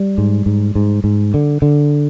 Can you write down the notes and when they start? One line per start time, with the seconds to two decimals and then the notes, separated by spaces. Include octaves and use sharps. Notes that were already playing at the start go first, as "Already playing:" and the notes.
Already playing: G3
0.18 G#2
0.46 G#2
0.75 G#2
1.04 G#2
1.34 D3
1.62 D3